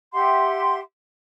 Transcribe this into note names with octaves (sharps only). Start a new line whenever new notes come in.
G4 E5 F#5 C6